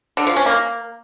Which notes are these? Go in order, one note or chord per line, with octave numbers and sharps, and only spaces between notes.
D3
F3
C#4
A#3